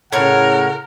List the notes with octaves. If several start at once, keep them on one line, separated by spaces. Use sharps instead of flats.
A2 C#3 A#4 C#5 F#5